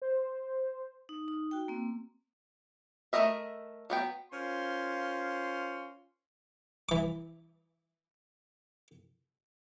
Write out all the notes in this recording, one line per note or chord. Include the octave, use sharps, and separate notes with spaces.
C5
D#4
D#4
F#4 G5
A#3 C4
A3 D4 A#4 D#5 E5
F#3 B3 G5
C#4 F4 A#4 C5 C6
E3 D6